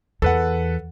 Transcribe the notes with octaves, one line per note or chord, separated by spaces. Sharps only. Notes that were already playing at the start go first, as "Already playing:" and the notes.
E2 A4 B4 F#5